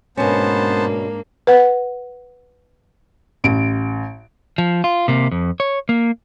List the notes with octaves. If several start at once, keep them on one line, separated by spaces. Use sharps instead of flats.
G#2 B2 A#3 B3 C#4 D4 C5 A5
B4 F#5
A1 D7
F3
F4
C3 A#3
F2
C#5
A#3